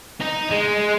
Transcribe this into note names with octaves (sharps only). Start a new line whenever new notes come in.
D#4
G#3